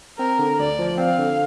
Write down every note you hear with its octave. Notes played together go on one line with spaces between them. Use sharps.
C4 A#4
D3
D2 D5
F3
C4 F5
D3